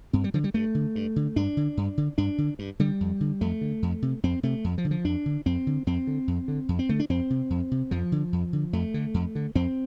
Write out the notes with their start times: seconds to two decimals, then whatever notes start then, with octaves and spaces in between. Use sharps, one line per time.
0.13 G2 C4
0.24 G3
0.34 D3 F3
0.44 G3
0.54 G2 A3
0.75 D3
0.95 G2
1.16 D3
1.36 G2 D4
1.57 D3
1.77 G2
1.97 D3
2.18 G2 D4
2.38 D3
2.59 G2
2.79 D3 G3
3.00 F2
3.20 D3
3.41 F2 A3
3.61 D3
3.82 F2
4.02 C3
4.23 F2 C4
4.43 C3 A3
4.64 F2
4.78 F3
4.85 D3
4.91 F3
5.05 F2 D4
5.26 D3
5.46 F2 C4
5.67 D3
5.87 F2 C4
6.07 D3
6.28 F2
6.48 D3
6.69 F2
6.79 C4
6.89 D3 A3
6.99 D4
7.10 F2 C4
7.30 C3
7.50 F2
7.71 C3
7.91 F2 F3
8.12 D3
8.33 F2
8.53 D3
8.73 F2 A3
8.94 D3
9.14 F2
9.35 D3
9.55 F2 C4